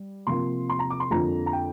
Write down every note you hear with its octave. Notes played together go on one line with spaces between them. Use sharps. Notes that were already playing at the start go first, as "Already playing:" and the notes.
Already playing: G3
C3 F3 A#3 C6
C6
A#5
D6
C6
F2 D3 F3 A#3 A#5
A#5
G5